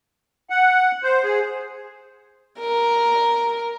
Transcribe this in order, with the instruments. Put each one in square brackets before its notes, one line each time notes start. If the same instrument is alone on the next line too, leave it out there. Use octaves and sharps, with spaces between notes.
[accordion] F#5
C5
G#4
[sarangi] A#4